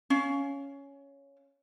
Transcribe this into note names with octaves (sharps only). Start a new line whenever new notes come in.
C#4 F5